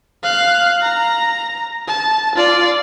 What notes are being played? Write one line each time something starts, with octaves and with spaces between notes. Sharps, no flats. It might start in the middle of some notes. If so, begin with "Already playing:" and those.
F5 F#6
A#5
A5
F4 D5